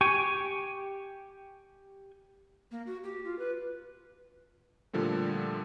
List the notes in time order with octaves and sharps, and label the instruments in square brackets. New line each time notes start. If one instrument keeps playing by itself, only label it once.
[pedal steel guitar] G4 G5 G#5 C#6
[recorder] A#3
F#4
G4
F4
B4
[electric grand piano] A#2 D3 F3 G3 A3